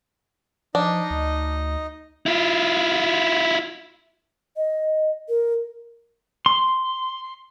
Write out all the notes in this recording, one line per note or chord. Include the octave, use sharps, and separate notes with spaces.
F3 D4 D#4 D#5
D2
E4 F4
D#5
A#4
C6